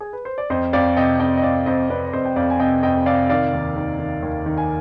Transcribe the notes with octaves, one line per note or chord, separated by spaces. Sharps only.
G#4
B4
C5
D5
F2 C5 D#5
F2 D5 F5
C3 D#5 G5
F2 D#5 G5
D#5
F2 D5 F5
F2 C5 D#5
F2 B4 D5
D5
F2 C5 D#5
G5
F2 D5 F5
G#5
C3 D#5 G5
F2 D#5 G5
C3 D5 F5
D#3 D5 F5
D#2
D#3
D#3
D#2
D#3
G#5